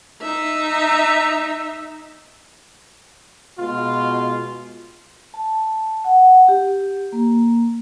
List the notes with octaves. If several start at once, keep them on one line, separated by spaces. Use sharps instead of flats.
D#4 E5
B2 G#3 F4
A5
F#5
G4
A#3